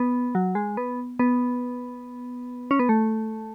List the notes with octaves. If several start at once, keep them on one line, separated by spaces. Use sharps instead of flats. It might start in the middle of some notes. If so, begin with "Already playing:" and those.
Already playing: B3
F#3
G#3
B3
B3
C#4
B3
A3